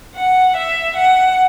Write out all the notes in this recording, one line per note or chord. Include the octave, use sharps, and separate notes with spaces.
F#5
E5
F#5